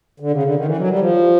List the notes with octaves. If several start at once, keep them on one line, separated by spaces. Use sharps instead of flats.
D3
C#3
D3
D#3
E3
F#3
G3
F3